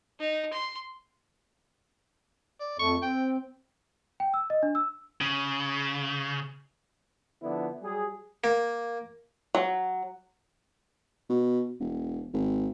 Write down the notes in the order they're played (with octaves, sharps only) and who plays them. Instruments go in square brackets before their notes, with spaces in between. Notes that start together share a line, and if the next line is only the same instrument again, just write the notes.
[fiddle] D#4
C6
[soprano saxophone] D5
[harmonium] F2 A3 [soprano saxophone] C#6
[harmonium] C4 [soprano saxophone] G5
[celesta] G5
E6
D#5
D4
E6
[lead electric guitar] C#3
[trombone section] D3 F3 B3 D4 E4
F#3 G3 G#4
[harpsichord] A#3
[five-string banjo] F#3
[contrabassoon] B2
E1
G#1